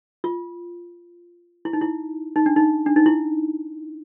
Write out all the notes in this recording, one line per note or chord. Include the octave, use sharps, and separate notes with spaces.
F4
E4
D#4
E4
D#4
D4
D#4
D4
D#4
E4